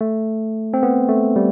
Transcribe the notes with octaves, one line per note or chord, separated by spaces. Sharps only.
A3
C4
B3
A3
G3